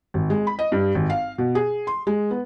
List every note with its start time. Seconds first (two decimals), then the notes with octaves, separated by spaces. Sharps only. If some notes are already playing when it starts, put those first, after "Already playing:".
0.14 G#1
0.30 G#3
0.47 B5
0.59 D#5
0.72 G2
0.95 G#1
1.10 F5
1.38 B2
1.55 G#4
1.87 C6
2.07 G#3
2.31 B3